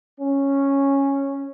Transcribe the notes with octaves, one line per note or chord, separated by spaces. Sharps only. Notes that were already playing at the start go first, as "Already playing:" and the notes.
C#4